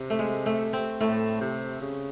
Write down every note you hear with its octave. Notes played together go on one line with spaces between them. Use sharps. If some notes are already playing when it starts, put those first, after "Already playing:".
Already playing: C3
A3
G#3
A3
C4
A2 A3
C3
C#3